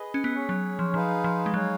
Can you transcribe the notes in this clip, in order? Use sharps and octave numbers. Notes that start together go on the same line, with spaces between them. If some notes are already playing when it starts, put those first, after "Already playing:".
Already playing: G#4 B4 D#5
C#4
B3
C#4 G#4 C#5
F#3
F3
F3 D#4 G#4 B4 F5
F3
G#3
F#3 D#4 G#4 C#5 F5